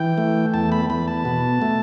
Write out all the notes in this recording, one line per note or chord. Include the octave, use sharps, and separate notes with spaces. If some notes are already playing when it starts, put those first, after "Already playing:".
Already playing: E3 G5
A3
E2 A5
B5
E2 B5
A5
B2
A3